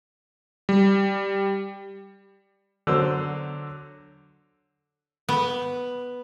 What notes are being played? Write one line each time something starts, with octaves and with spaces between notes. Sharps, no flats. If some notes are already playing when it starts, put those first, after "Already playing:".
G3
D3 F#3 C5 E6
B3